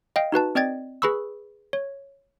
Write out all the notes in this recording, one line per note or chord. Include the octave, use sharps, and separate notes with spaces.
D#5 F5 G5
D#4 F#4 B4 A5
C4 D5 D#5 G5 G#6 A6
G#4 B4 B5 C#6 E6
C#5